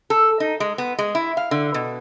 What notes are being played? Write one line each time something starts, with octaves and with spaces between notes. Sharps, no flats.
A4
D#4
G#3
B3
G#3
E4
F5
D3
B2